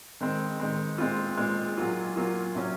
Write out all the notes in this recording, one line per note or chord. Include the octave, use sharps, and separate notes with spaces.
D#3 G#3 C4
D#3 G#3 C4
A#2 G#3 C4 F4
A#2 G#3 C4 F4
A#2 F#3 A#3 F4
A#2 F#3 A#3 F4
C3 F#3 C#4